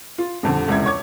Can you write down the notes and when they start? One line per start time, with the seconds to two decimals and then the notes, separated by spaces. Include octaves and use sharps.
0.18 F4
0.43 D#1 F2 D3
0.68 E1 C#2 C3 E4 G#6
0.86 C#5 C#6 D6 G#6